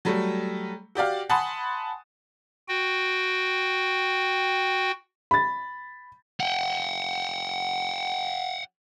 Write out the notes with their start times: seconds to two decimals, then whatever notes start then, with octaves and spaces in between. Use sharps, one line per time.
0.05 F#3 G3 A3
0.95 F#4 G4 D5 F5
1.29 F#5 G#5 A5 B5 C6 D#6
2.68 F#4 G5
5.31 B5 A6
6.40 F#5 G5